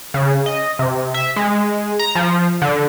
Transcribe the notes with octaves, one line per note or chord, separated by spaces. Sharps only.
C#3
D#5
C3
E5
G#3
A#5
F3
D3